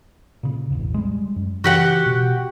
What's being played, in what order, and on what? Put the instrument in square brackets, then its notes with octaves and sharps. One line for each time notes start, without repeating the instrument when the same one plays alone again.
[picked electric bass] A#2 C#3
E1 A1 E2
G3 G#3
F#2
[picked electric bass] C#3 E3 [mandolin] F#4 G4 F#5
[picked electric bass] B2